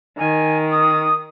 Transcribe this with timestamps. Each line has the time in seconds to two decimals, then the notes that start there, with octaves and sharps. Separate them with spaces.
0.19 D#3 G#5
0.71 D#6